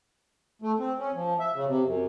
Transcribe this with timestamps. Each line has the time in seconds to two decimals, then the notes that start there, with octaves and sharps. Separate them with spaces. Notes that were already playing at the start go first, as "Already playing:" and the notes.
0.62 A3
0.79 C4
0.99 C#4
1.14 F3
1.40 E5
1.55 C#3
1.67 C3
1.85 F#2